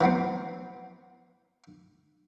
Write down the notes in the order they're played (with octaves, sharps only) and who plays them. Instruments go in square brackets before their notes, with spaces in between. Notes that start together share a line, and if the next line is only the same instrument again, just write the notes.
[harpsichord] E3 F#3 B3 C4